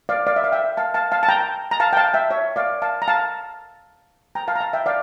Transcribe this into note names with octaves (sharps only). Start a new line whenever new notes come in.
D5 F5
D5 F5
E5
F5
E5 G5
F5 A5
F5 A5
F5 A5
A5
G5 A#5
A#5
F5 A5
G5
F5 A5
E5 G5
C#5 E5
D5 F5
F5 A5
A#5
F5 A5
G5 A#5
F5 A5
A#5
F5 A5
E5 G5
D5 F5